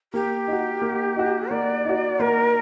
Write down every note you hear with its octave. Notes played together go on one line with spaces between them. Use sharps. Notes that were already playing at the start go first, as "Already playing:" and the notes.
A#3 G4
D#4 F#4
A#3
D#4 F#4
A#3 D5
D#4 F#4
A#3 A#4